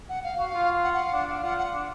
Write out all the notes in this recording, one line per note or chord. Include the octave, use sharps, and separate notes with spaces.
F#5
F5
F#4 F5
F4
F#5
F#5
F5
D4 F#5
D4 F5
F4 F#5
F4 F#5
D4